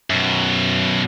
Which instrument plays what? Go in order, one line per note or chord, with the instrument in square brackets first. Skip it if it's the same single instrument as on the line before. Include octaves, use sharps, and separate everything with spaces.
[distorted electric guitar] F#2 B2